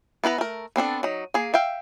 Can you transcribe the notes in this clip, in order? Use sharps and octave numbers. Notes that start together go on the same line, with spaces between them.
B3 E4 B4 A#5
A3 A#4
B3 C4 D4 A4
F#3 D#4
A#3 G#4
E5 F5 G5